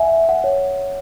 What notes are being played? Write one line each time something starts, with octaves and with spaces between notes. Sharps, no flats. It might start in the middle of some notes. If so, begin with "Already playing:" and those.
Already playing: E5 F#5 G#5
F#5
C#5